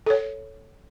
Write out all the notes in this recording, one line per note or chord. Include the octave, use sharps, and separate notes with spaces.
A4 C#5